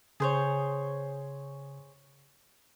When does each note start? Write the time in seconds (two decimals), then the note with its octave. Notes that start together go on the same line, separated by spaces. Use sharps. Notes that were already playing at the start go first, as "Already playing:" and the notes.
0.20 C#3 G#4 C5 C#5